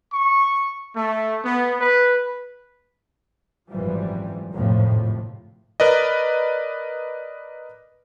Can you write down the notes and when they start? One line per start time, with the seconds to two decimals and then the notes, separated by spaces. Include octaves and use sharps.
0.12 C#6
0.94 A3
1.43 B3
1.79 B4
3.70 G#1 F#2 A#2 E3 F3 G3
4.53 G#1 F2 A2 C3 F3
5.80 A#4 B4 D5 D#5